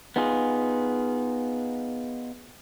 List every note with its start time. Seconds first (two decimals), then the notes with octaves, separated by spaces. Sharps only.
0.16 B3 D#4 F4 G#4